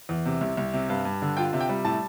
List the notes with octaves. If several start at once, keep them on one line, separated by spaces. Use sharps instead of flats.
E2
C3
C2
C2
C3
G2 F5
G2
D3
F4 G5
C3
G5
G3
A2 A5